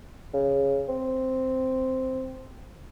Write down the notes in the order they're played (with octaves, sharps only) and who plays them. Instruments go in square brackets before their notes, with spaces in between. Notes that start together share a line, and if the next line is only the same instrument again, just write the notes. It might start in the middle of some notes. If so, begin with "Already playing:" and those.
[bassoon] C#3
C4